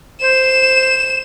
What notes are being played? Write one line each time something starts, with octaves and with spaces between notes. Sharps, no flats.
C5 E7